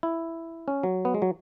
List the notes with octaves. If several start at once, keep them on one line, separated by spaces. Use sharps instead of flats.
E4
C#4
F#3
B3
G#3
F#3